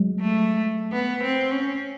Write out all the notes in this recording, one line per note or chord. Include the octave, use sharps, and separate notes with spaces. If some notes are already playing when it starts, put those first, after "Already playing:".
Already playing: F#3 G#3
A3
B3
C4
C#4